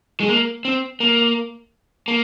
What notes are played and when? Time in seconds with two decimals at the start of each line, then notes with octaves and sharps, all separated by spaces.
0.20 G#3
0.29 A#3
0.65 C4
1.00 A#3
2.08 A#3